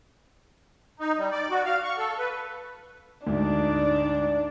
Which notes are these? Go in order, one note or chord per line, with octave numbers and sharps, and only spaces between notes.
D#4
G3
D5
F#4
F5
C#6
A4
B4
D2 G#2 D4 D#4 D5